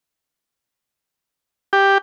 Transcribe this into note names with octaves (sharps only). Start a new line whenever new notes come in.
G4